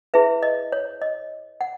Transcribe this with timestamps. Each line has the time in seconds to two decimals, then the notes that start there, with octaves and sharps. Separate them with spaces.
0.14 E4 G#4 B4 E5
0.43 D#5
0.72 C#5
1.02 D#5
1.61 F#5